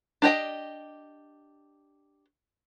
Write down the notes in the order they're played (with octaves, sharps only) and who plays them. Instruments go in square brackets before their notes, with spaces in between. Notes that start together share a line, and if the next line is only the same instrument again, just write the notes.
[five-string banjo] D4 G4 D#5 G5